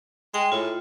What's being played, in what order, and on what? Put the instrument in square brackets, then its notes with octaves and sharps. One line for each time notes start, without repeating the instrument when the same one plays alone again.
[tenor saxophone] G#3 [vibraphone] G5
[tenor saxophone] A2 [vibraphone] F4